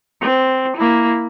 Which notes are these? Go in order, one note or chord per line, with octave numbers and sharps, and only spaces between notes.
C4
A#3 E4